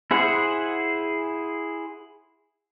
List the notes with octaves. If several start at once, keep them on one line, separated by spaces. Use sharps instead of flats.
E4 G#4 C5 F#5